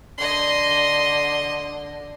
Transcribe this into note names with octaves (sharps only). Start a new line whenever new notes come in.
D3 D#5 C6